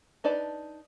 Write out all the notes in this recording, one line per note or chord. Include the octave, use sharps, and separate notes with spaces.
D4 D#4 B4 D5 A5